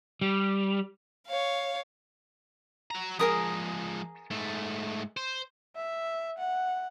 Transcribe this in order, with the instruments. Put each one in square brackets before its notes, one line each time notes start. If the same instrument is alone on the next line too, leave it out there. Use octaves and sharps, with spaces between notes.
[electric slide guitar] G3
[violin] C#5 F5
[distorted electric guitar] F#4 A#5
[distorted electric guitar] F3 G#3 [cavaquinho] G#4 A#4 D#6
[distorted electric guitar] G#2 A3
C5
[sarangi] E5
F#5